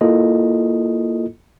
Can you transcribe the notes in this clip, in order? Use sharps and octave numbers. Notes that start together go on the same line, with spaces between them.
A#3 E4 F4 A4 D#5